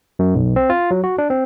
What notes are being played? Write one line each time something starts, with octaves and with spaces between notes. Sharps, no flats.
F#2
B1
C4
F4
F#3
F#4
D4
C4